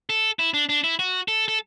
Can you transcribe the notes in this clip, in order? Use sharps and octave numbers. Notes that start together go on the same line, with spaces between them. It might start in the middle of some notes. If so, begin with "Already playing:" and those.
A4
E4
D4
D4
E4
F#4
A4
A4